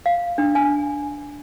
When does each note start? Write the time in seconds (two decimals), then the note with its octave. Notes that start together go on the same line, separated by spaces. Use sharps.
0.06 F5
0.38 D4
0.55 G#5